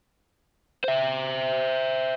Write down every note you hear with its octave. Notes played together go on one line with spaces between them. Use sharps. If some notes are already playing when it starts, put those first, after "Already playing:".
C5 E5